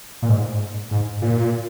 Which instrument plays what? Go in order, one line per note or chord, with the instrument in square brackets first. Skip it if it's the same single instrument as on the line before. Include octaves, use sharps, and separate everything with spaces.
[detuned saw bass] A#2
G#2
G#2
A#2